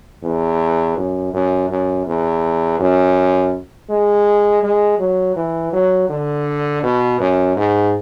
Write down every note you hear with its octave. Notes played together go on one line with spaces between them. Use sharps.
E2
F#2
F#2
F#2
E2
F#2
G#3
G#3
F#3
E3
F#3
D3
B2
F#2
G#2